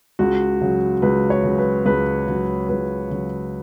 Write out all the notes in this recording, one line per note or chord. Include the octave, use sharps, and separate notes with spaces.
C#2 F#4
C#3 F#3
C#2 B4
C#5
C#3 F#3
B4
C#2 B4
C#3 F#3
C#2 B4
C#3 F#3